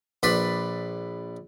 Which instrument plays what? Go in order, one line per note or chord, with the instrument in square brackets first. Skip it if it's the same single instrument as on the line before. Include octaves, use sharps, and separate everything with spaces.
[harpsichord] A#1 B4 D5 B5 C6